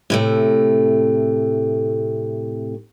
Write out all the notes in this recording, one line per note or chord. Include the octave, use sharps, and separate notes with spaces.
A2 C3 A3